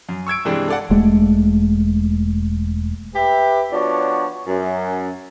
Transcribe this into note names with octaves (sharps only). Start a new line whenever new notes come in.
F#2
C#6 E6 G#6 D7
G2 C3 E3 G#3 C4 D4
A4 D5 F#5
E1 G#3 A3
G4 B4 E5
F3 B3 D4 F#4 C#5 D5
F#2